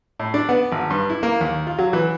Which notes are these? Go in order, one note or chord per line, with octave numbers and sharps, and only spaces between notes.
A2
D4
B3
G#1
G2
E4
A#3
D#2
F4
F#3
E3